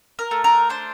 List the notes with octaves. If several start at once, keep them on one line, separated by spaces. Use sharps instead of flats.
A#4
A3
A#4
D4 C5